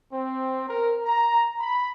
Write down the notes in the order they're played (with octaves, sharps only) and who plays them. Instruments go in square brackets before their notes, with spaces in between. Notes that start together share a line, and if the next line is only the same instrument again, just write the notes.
[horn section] C4
A#4
A#5
B5